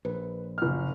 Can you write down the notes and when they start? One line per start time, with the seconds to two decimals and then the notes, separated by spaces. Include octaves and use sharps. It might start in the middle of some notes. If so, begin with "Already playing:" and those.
0.05 A#1 B4
0.58 F#1 F6